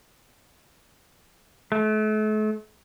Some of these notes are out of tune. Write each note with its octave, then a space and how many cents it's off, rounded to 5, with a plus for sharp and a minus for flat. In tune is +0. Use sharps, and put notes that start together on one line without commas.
A3 -40